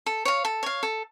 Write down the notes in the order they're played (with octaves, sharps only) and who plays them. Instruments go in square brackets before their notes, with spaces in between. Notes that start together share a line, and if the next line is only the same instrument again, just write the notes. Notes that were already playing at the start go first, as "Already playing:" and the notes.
[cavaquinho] A4
C#5 F5
A4
C#5 F5
A4